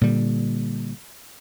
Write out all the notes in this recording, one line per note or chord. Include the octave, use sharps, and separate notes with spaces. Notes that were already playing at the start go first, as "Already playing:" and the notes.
A#2 D3 G3